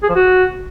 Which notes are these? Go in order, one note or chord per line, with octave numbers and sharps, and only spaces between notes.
G#4
F3
F#4